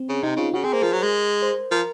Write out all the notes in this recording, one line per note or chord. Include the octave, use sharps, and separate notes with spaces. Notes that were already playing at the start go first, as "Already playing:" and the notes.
Already playing: C4
C#3
C3 D#4
C#3 F4
C#3 F#4
C4 G#4
A#3 C5
F3 A#4
F#3
G#3
C5
F3 A#4